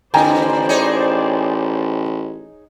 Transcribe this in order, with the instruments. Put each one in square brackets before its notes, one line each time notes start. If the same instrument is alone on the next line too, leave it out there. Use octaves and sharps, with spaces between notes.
[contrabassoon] A1 [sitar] D3 [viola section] C5 D5 [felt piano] G5 G#5 A#5
[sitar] D#4 G#4 C#5